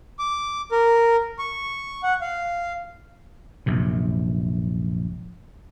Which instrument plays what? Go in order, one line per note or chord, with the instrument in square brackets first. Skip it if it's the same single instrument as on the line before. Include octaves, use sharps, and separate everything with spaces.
[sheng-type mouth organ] D6
A#4
C#6
F#5
F5
[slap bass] A#1 F#2 C3